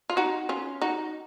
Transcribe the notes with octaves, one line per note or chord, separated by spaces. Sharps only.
F4
D#4 F#4
C#4 F4
D#4 F#4